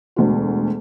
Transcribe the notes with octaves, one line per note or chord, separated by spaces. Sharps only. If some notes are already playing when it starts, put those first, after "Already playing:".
E1 D2 F#4